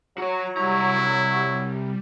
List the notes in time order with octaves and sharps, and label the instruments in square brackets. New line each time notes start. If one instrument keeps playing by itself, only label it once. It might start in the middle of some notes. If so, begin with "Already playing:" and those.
[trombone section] F#3 [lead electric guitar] F#4 C#5 [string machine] A#5
[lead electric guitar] C2 A#5 [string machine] G3 [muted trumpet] E4